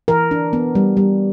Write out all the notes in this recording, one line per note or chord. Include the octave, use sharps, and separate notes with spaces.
E3 A#4
D4
B3
G3
G3